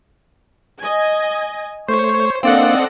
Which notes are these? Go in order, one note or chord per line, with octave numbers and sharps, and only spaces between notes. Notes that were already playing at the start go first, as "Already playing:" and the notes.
D#5 G#5
A3 C5 C#5 C#6
A#3 C4 D4 A4 D5 D#5 F5 F#5